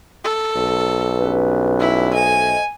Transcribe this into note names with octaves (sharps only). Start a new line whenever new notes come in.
A4
B1
G2 C#4 B4
E4
A3 C5 D#5 G#5